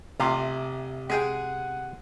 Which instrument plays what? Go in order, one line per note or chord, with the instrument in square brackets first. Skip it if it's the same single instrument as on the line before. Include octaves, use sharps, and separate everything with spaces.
[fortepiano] A1 F4 [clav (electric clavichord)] C3
[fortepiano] G#3 G#4 G5 [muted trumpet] F#5